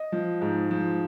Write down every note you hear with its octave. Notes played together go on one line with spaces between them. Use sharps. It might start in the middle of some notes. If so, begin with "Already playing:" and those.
Already playing: D#5
F3
G#2
F3